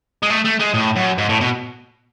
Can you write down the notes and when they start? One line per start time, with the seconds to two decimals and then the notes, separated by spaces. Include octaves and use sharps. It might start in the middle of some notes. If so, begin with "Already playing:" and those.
0.23 G#3
0.30 A3
0.45 A3
0.60 G#3
0.75 A2
0.96 F#2
1.18 G#2
1.29 A2
1.41 B2